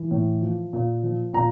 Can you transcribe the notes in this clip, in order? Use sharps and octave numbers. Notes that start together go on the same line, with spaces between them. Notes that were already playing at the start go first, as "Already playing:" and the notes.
Already playing: E3
A2
F3
A#2
F3
A#2 A#5